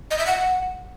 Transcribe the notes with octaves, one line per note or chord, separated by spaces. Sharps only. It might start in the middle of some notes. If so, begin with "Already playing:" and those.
D#5
E5
F#5